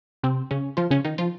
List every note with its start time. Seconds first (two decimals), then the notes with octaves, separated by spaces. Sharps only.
0.23 C3 C4
0.51 C#3 C#4
0.77 F3 F4
0.90 C#3 C#4
1.05 D#3 D#4
1.18 F3 F4